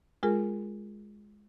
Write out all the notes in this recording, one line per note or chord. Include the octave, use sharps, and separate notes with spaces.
G#3 F4 G#4 A#4